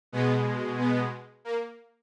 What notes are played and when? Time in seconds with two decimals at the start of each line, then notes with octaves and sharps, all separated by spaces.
0.12 B2 G#3 B3
0.79 B3
1.45 A#3